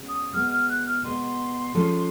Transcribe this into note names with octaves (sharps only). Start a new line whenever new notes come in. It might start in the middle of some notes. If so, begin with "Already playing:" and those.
Already playing: B2 G#3 C#4
D#6
B2 G#3 B3 F6
F6
F#6
F6
B2 G#3 B3 C6
F3 G#3 C#4 F4 A4